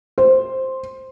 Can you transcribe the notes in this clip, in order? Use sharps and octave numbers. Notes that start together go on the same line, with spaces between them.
C5